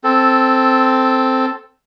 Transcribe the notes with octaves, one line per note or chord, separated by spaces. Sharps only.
C4 A4